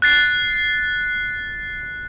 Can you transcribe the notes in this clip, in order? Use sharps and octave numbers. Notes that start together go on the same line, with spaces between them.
F#6 A6 C7